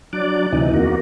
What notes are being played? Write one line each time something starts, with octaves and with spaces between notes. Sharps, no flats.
F#3 D4 D5
D2 C3 E3 D#4
E2 A#3 F#4